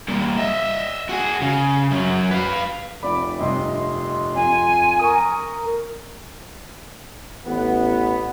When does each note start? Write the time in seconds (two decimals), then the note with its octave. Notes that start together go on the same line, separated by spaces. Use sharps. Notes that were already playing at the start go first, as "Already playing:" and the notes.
0.08 G3 A#3
0.37 D#5 E5
1.09 F#4 G#4
1.41 C#3
1.91 F#2 F#3
2.31 B4 F5
3.03 F1 D5 B5 D6
3.39 G2 C3 D#5 C6
4.35 F2 G#5
5.00 A#4 C#6 D#6
7.46 A1 B3